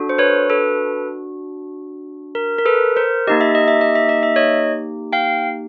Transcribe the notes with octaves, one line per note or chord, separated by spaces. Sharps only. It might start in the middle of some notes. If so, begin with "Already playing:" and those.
Already playing: D4 F#4 A4
C5
B4 C#5
A4 B4
A#4
A#4
A4 B4
A#4 C5
A#3 D#4 G4 D#5
E5
D#5
E5
D#5
E5
D#5
E5
C#5 D#5
F5 G5